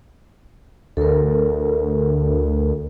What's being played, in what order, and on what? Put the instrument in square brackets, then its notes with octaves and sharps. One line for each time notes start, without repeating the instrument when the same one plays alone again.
[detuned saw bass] D2 [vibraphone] A4 A#4